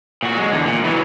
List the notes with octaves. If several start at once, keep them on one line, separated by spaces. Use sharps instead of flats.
A#2 F#4
F#3 G#3
E2 D3
A#2
E3 F#3